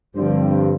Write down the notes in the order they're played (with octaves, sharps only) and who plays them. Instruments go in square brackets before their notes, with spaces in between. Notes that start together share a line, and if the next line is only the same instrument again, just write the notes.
[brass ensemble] G2 [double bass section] D3 F3 C4